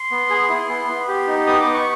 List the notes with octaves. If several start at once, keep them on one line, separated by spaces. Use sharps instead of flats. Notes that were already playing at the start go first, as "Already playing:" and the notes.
Already playing: C6
B3
G#4
E4
B3
B3
G4
D#4
B3 D#6
D6
B3
C#6